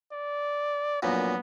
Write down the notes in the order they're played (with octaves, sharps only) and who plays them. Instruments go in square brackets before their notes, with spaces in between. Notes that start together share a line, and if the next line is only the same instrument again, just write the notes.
[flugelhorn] D5
[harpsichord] A#1 F#2 A#2 [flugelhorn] B3